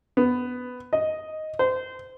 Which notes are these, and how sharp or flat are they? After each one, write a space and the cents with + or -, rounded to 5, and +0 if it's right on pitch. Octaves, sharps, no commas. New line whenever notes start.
B3 +10
D#5 +5
C5 -25